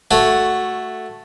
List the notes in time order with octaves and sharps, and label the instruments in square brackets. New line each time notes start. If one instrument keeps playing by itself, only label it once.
[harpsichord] A3 F#4 C#5